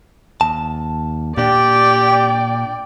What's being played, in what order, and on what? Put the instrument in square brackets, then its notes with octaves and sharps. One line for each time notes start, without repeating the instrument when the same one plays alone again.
[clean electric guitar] D#2 A5
[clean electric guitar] A#2 D4 [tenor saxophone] G4 [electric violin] D5 G5